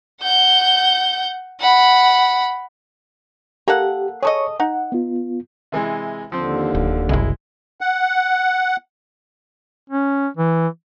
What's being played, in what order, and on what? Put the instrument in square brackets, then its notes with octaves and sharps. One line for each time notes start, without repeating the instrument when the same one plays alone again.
[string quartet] F#5 G6
F#5 B5
[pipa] A#3 A4 F#5 [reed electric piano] G4
[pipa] G#4 A4 D#5 [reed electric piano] C#5 C#6
[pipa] D#4 [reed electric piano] F#5
[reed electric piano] B3 F4
[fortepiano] C3 E3 G#3
[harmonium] D#2 D3 [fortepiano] F3 C4
[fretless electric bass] D1
[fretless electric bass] F#1 C2 [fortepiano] G#3 E4
[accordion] F#5
[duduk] C#4
E3